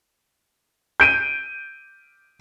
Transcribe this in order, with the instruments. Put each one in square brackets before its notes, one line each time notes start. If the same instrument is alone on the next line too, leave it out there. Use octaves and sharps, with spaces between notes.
[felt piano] G6 D7 D#7